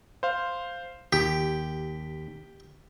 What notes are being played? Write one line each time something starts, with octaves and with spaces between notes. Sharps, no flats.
C5 F5
D#2 G4 B6